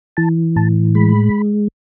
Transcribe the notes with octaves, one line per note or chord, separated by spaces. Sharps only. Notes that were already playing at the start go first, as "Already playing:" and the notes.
E3 A5
A2 A5
G#3 B5